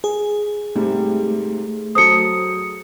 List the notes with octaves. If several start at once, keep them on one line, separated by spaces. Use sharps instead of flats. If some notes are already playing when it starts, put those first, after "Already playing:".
G#4
G#2 C3 G3 A3
F#3 A4 C5 D#6 C#7